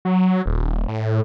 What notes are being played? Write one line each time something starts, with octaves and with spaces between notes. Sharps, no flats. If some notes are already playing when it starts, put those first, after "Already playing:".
F#3
D#1
A2